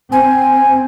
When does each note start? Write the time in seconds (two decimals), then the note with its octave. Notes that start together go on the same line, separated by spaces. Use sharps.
0.12 C4 G#5